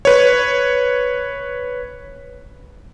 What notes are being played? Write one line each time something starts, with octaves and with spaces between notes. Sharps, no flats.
B4 C#5